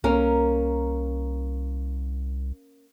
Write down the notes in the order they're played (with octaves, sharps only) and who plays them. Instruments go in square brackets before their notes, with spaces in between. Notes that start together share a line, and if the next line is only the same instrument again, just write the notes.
[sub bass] C2 [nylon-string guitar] A#3 C#4 A#4